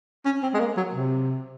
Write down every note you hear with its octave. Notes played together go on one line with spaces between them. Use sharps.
C#4
C4
G#3
A#3
F#3
C3